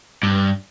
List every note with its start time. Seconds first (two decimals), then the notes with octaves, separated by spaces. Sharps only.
0.23 G2